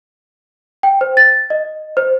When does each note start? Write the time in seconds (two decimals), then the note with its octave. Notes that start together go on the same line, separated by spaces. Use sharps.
0.83 G5
1.01 C5
1.17 A6
1.50 D#5
1.97 C5